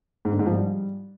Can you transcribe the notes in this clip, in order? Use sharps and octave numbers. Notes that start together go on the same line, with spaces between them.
G#2
D3
G#2
F3
G3